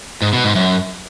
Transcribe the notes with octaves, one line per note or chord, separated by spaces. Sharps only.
G#2
B2
G#2
F#2